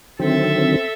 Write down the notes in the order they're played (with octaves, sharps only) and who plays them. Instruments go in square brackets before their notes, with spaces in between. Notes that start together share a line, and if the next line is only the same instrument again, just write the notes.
[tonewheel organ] D3 D#3 F#3 [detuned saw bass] C4 [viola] A4 E5